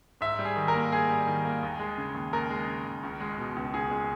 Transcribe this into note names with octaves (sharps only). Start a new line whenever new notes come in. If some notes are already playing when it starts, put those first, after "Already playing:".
G#2 E5
G3
G#4
D#3
A#4
A#3
G#2 G#4
G3
D#3
A#3
D#2
G#3
C#3
D#2
D#2 A#4
G#3
C#3
D#2
C#2
G#3
B2
C#2
C#2 G#4
G#3